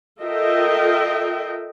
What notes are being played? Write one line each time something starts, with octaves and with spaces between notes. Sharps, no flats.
F4 A4 A#4 D#5 E5 G5